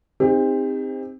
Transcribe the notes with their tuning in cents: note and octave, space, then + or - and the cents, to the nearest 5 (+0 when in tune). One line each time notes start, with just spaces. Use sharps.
C4 +0 D#4 +0 G4 +40